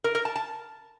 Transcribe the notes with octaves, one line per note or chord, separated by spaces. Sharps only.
A#4
A#4
A5
A5